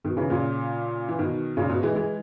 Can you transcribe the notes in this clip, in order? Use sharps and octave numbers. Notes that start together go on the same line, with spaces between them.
B2 D#3
C#3 E3
A#2 C#3
E3
B2 D#3
A#2 C#3
G#2 B2
E3 G#3
E3 G#3